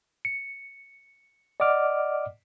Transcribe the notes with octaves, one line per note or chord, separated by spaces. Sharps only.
C#7
D5 D#5 F#5 D6 F6